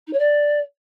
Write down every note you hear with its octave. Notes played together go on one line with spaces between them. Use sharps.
D#4
C#5
D5